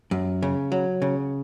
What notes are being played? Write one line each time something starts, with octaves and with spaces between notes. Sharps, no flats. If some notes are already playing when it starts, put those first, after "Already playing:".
F#2
C#3
F#3
C#3